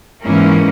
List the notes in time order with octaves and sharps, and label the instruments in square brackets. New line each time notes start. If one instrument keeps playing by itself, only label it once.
[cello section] G#2 E3 A#3 C#4